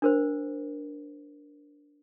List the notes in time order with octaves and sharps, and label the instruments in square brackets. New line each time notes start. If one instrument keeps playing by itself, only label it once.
[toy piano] D4 A#4 C5